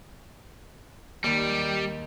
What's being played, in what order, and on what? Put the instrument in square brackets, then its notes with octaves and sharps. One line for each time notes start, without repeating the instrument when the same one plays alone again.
[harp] D#2 D#3 [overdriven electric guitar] G3